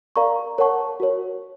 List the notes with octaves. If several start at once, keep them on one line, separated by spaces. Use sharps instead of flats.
A#4 D5 F5 A#5 C#6
A#4 C#5 F#5 A5 C#6
F#4 A#4 C#5